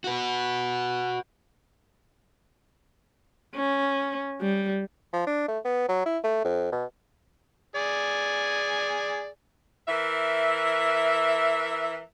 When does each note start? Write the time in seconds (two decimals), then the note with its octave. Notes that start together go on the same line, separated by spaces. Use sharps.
0.04 F#4 B4
3.55 C#4
4.41 G3
5.13 F3
5.27 D4
5.48 A3
5.65 B3
5.88 F#3
6.06 E4
6.23 A3
6.45 F2
6.72 B2
7.76 G#4 D5 G#5
9.87 E3 A#4 E5